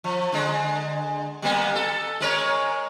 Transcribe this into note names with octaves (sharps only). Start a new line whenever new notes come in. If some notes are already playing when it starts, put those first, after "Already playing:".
F3
D3 G#3
G3 A#3 B3
A4
G#3 A#4 C#5